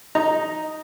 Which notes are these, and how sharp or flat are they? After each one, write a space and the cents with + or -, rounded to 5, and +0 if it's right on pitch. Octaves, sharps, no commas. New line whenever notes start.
D#4 +0 A#5 +0